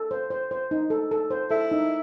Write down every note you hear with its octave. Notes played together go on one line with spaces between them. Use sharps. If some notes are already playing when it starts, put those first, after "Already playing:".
Already playing: A4
C5
C5
C5
D#4
A4
A4
C5
E4 A4
D#4